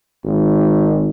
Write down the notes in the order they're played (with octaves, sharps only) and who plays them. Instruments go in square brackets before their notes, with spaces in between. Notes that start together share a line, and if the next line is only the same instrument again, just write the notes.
[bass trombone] G#1